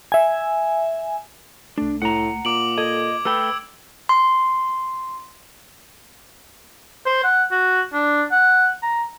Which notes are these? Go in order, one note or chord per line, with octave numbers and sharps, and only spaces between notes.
E5 G#5
C2 A3 D4
A2 F#5 A#5
A#2 D6 D7 F#7
A4 D#5 G#6
A3 A4 B4 G5 B5 E6
C6
C5
F#5
F#4
D4
F#5
A#5